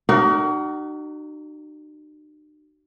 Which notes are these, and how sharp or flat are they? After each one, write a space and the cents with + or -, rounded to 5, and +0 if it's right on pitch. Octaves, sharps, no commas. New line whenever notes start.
D#4 -45 F#4 +35 A#4 +0